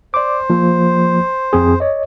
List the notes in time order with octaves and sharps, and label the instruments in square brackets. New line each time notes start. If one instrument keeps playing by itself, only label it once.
[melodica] C5 [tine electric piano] D5 D6
[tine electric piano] F3 A#3
F2 C4 G#4
C#5 D#5